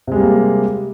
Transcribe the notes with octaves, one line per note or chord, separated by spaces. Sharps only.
C3 G3 G#3 A#3